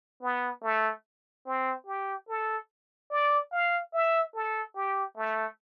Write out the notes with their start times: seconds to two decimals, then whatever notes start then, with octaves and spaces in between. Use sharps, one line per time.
0.22 B3
0.63 A3
1.46 C4
1.87 G4
2.28 A4
3.10 D5
3.52 F5
3.93 E5
4.34 A4
4.75 G4
5.17 A3